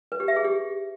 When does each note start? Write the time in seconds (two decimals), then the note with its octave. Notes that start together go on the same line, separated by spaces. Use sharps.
0.12 B4
0.20 G4
0.28 E5
0.36 G#4
0.44 G4